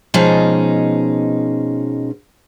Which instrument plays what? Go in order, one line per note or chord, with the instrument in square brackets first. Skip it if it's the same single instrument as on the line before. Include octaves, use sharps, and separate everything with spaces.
[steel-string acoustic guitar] B2 F3 G#3 C#4 D#4